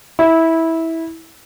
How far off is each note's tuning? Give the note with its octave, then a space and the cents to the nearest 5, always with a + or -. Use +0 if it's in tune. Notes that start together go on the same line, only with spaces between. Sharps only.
E4 -15